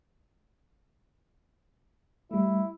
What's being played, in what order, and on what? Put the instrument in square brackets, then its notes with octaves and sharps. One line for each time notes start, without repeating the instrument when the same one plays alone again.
[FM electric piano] G3 A3 [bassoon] E4